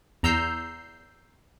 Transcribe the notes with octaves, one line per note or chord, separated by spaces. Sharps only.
E2 A#5 E6 G6 C7